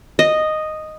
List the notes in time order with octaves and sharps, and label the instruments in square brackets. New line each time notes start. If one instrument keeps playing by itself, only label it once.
[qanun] D#5